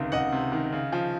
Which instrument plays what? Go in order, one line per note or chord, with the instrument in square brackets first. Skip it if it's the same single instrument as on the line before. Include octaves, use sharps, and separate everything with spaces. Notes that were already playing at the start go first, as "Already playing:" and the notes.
Already playing: [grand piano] C#2 C3 D#3
C#2 D#5 F#5
C3
D#3
C#3
F3